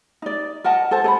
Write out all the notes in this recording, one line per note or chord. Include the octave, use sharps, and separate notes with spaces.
D#4 D5
A#4 D#5 F#5 A5
A4 C5 A5
A4 F#5 B5